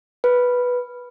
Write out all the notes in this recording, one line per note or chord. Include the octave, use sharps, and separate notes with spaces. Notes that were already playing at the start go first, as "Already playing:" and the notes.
B4